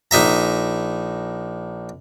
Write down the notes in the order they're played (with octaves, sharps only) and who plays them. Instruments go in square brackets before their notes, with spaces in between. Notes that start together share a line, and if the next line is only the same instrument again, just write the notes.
[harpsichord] A#1 D#4 E5 A#5